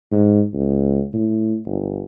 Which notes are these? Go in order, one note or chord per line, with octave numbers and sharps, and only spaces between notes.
G#2
C#2
A2
G1